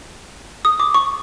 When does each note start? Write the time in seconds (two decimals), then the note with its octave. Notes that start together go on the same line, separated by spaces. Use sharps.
0.65 D#6
0.80 D6
0.94 C#6